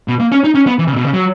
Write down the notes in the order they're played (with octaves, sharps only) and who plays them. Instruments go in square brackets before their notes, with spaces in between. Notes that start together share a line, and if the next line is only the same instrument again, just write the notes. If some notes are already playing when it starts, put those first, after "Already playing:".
[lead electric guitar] B2
A#3
C#4
D#4
C#4
B3
E3
C#3
A#2
B2
C#3
F#3